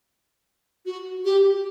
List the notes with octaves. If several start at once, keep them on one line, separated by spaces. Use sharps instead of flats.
F#4
G4